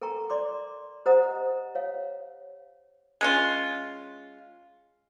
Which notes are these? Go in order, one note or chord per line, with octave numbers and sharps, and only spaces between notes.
A4 A#4 G5 A#5 C#6
D5 C6 D6
G4 C5 D#5 F#5 A#5 D#6
C#5 F5
G#3 C#4 F4